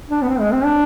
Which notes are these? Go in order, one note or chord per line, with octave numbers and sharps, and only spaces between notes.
D4
B3
C4
G#3
C4
D4